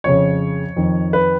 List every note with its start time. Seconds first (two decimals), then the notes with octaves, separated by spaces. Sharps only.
0.04 F2 C#3 C#5
0.76 F2 D#3
1.13 B4